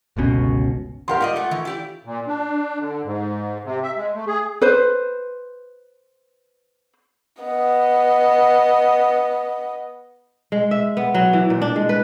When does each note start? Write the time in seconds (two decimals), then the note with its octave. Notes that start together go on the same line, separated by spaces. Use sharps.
0.17 G1 C#2 B2 C#4
1.08 E2 G4 A#4 F5 F#5 C6
1.20 G#2 F4 D5 D#5
1.36 A3 F#5
1.51 D#3 E3
1.65 E4 G4 D5
2.05 A#2
2.27 D4
2.81 D3
3.04 G#2
3.64 C3
3.83 E5
3.96 G#3
4.15 A3
4.27 G#4
4.62 B4 C5
7.42 B3 D#5
10.52 G#3
10.71 E5
10.97 B3
11.14 F#3
11.33 E3
11.50 A#2
11.62 D4
11.76 G#3
11.89 B4